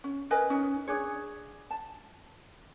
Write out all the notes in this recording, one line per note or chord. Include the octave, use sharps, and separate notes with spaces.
C#4
A#4 B4 D#5 G#5
C#4 D#4
D4 G#4 C#5
A5